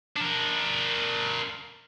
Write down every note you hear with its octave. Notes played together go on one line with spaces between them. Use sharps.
D4 A#4